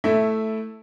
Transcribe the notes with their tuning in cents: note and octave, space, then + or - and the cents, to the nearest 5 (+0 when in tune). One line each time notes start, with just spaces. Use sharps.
A3 +0 E4 -5